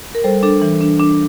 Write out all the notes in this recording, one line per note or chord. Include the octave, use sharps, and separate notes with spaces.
A#4
G3 A4 C5
D4 A4
E3
D4
D4